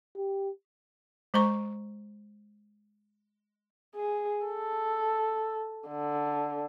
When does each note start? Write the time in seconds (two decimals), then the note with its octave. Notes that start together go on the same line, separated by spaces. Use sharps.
0.16 G4
1.34 G#3 C5 A#5 C#6
3.96 G#4
4.46 A4
5.88 D3